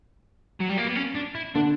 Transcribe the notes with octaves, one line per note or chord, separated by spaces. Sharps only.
F#3
G3
A#3
B3
C#4
D4
E4
D3 D4